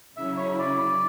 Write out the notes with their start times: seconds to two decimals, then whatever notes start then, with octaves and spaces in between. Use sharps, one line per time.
0.16 C#3 F#3 C#4 E4 E5
0.37 C#5
0.59 D5